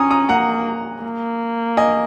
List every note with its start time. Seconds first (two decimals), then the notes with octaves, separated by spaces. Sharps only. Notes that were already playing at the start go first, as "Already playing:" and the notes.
Already playing: C#4 G#5 A#5 D#6
0.10 A#5 D#6
0.29 A#3 F#5 A#5
1.03 A#3
1.77 D#5 G#5